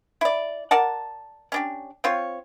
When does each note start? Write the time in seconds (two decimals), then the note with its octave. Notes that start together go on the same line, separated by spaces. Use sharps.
0.21 E4 D5
0.71 A#4 D5 F#5 A5
1.52 C#4 D4 G4
2.04 C4 F4 C#5